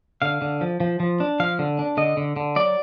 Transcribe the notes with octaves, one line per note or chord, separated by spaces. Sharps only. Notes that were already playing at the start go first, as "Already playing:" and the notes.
D3 F5
D3
F3
F3
F3
D4
F3 F5
D3
D4
D3 D#5
D3
D3
F#3 D5